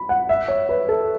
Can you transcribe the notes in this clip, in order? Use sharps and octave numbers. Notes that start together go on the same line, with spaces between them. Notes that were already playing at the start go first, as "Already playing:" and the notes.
Already playing: B5
F#5
E5
C#5
B4
A4